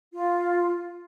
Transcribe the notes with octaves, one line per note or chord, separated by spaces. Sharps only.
F4